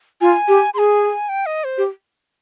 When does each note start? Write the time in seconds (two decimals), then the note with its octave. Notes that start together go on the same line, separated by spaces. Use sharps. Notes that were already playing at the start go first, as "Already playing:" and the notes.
0.21 F4 G#5
0.48 G4
0.74 G#4 G#5 C6
1.29 G5
1.46 D#5
1.64 C5
1.78 G4